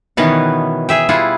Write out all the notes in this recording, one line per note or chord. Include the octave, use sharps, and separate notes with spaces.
B2 D#3 E3 B3 C#4 F#5
G#4 E5 G5
G3 E4 F4 G#4 F#5